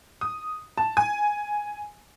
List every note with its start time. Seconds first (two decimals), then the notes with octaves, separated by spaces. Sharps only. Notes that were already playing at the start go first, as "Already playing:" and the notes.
0.21 D#6
0.78 A5
0.97 G#5